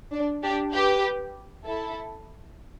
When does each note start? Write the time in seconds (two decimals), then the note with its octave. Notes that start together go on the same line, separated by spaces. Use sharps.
0.12 D4
0.43 D4 G4
0.73 G4 B4
1.65 E4 A4